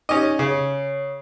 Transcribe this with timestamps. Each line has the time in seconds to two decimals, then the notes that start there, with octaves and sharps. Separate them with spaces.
0.09 C#4 D#4 G4 D#5
0.39 C#3 C#5